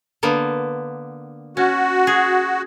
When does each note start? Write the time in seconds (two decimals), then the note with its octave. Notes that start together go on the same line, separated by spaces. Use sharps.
0.23 D3 A#3 B3
1.57 C#4 F#4
2.07 G#4